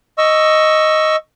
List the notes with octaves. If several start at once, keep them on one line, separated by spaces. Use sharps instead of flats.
D#5 C#6 E6